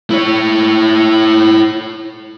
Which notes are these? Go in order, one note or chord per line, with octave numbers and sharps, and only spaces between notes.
E4 C#5